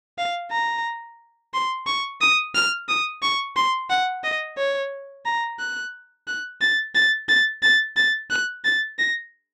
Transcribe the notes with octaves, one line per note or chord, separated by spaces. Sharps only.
F5
A#5
C6
C#6
D#6
F6
D#6
C#6
C6
F#5
D#5
C#5
A#5
F#6
F#6
A6
A6
A6
A6
A6
F#6
A6
A#6